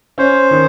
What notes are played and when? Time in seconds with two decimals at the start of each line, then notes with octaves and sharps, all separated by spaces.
0.18 C#4 C5
0.51 D#3